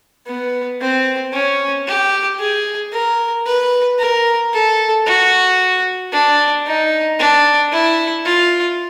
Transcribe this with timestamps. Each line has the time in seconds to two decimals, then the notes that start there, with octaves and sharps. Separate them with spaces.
0.27 B3
0.81 C4
1.33 C#4
1.87 G4
2.40 G#4
2.93 A#4
3.46 B4
3.99 A#4
4.54 A4
5.07 F#4
6.13 D4
6.67 D#4
7.20 D4
7.73 E4
8.26 F4